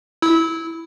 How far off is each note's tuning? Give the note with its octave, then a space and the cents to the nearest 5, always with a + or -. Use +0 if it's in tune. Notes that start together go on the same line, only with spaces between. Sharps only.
E4 +0 E6 -25